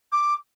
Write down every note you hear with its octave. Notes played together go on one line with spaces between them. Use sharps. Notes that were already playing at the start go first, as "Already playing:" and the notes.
D6